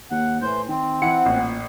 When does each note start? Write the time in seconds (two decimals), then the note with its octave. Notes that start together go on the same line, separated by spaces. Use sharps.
0.11 D#2 F#5
0.42 A2 E3 C5 G6
0.69 D#3 C4
1.02 E3 F#5 C#7
1.26 A1 A#2